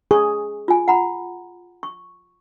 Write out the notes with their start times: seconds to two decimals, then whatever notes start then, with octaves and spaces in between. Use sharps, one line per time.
0.11 G#4 C#6
0.68 F4 G#5
0.88 F#5 A#5 B5
1.83 C#6